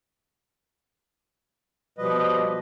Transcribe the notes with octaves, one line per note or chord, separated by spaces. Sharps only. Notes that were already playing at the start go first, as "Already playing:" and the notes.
B2 F3 G3 B4 D#5